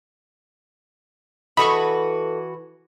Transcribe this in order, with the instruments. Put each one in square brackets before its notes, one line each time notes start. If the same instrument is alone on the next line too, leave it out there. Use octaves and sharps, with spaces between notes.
[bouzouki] E3 F#4 B4 [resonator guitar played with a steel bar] A4 D#5 [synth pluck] B5 C#6